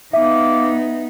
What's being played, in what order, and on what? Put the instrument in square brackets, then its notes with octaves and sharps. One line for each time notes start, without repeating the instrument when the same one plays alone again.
[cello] B3 D#4 [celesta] E5 [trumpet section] F5 D6